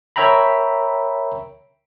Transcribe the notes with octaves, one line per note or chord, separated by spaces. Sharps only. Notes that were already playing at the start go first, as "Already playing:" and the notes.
A#4 C#5 E5 G5 A#5 B5